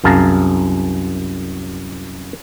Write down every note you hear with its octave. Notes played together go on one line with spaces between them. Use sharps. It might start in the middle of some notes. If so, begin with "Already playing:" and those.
C2 F#2 G#4 F5 A5 A#5